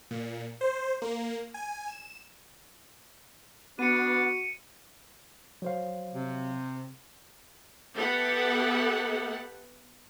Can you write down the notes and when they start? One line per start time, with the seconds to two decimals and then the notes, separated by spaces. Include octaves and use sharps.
0.11 A#2
0.61 C5
1.02 A#3
1.54 G#5
1.88 E7
3.79 B3 D4 F#4 C#7 D#7
5.62 F#3 C5 F5
6.15 C3
7.95 B3 G4 A4 E5 F#5